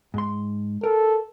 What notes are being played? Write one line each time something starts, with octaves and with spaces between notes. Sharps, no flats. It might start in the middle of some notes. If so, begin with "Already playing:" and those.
G#2 C6
A4 A#4